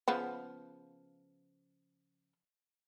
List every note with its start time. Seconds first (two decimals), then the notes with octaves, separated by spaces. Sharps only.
0.08 C#3 F3 B3